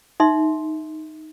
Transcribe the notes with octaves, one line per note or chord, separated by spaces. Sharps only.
D#4 E5 C6